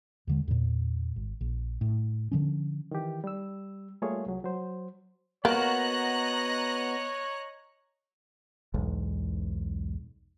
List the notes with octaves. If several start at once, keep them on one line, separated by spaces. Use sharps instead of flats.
D#2 D3 G#3
E2 A#2
G#1
A#1
A2
D3 F3 C#4
D#3 E3 G4
G3 E6
G3 A3 A#3 F4 G#4 C#5
C2 F#3
F#3 C5
A#3 B3 F#4 C#5 D#5 A#5 F#6
B1 E2 G#2